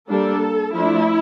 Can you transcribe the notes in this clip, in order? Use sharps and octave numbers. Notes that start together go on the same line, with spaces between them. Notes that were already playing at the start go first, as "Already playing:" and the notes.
G3 A#3 D4 A4
F3 A3 D4 E4